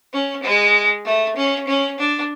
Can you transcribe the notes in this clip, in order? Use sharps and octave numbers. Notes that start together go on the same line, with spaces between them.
C#4
G#3
A3
C#4
C#4
D4